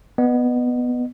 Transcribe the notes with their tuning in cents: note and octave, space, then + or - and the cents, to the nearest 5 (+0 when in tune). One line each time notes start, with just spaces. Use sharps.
B3 +0 D#5 -30